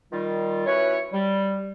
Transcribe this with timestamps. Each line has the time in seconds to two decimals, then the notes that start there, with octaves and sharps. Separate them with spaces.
0.12 D#3 G3 F4
0.66 C#4 E4 F#4 B4 C#5
1.13 G3